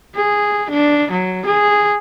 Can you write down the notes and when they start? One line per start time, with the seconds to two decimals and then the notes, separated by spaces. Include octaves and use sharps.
0.15 G#4
0.71 D4
1.12 F#3
1.46 G#4